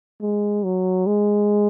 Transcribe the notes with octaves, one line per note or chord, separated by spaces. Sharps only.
G#3
F#3
G#3